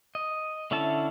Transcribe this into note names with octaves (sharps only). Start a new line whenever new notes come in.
D#5
D3 C#4 E4 E5 A5